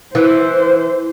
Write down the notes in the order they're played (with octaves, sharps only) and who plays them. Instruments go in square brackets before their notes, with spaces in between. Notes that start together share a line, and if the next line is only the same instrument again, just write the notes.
[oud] E3 [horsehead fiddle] C5